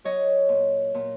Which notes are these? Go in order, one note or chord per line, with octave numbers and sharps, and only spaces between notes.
F#3 C#5 D#5
A#2
A#2